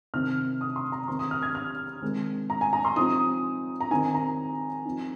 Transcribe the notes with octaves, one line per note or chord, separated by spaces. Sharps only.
C3 D#3 C4 D#4 F6
D#6
C6
A#5
D#3 C4 D#4 C6
D#6
F6
G#6
F6
D#3 G#3 C4
A#5
G#5
A#5
C6
F3 C4 D#4 D#6
A#5
D#3 C4 D#4 G#5
A#5
F3 C4 D#4